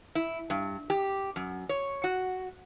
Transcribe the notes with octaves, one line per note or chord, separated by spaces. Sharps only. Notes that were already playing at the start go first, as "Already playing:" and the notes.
E4
G2
G4
F#2
C#5
F#4